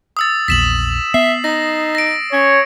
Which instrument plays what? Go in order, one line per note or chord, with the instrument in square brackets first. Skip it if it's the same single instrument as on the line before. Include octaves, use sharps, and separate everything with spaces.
[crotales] D#6 E6 A6
[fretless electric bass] A#1 E2 [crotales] B6 E7 F#7
[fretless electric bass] B3 [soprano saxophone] E5 [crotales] C7
[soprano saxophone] D#4 [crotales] A#6
[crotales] A#6 D7
[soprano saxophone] C#4 [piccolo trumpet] C#5